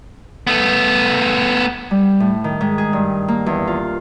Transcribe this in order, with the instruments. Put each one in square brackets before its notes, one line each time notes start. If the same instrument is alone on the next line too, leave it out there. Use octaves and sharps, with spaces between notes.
[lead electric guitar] A3 B3
[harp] G3
A2
D#3
G#2
G#4
G2
A#3
E2
F4